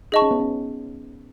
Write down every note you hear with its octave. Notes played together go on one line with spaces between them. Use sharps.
D#4 G#4 D#5 A5 C#6
C#4
B3
C#4